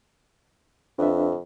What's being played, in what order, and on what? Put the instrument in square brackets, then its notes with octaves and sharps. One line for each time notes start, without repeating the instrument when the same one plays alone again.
[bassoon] F2 [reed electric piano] D4 B4 E5